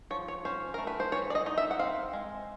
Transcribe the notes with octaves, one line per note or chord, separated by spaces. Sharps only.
F3 C#5
C#5
C#4 C5
A3 A#4
B4
C5
E3 C#5
D5
D#5
D#4 D#5
E5
F#5
C4 F5
G#3